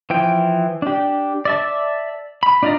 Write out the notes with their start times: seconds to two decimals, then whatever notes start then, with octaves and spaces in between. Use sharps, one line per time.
0.10 E3 F3 G5
0.82 D4 G4
1.45 D5 E5 A5
2.43 B5
2.63 D4 D#4 F4 D5 A#5